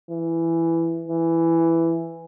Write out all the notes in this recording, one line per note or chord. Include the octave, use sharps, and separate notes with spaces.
E3
E3